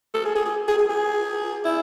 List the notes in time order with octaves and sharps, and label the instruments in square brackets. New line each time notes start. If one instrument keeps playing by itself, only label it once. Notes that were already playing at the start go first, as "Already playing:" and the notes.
[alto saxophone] A4
G#4
G#4
G#4
G#4
G#4
G#4
E4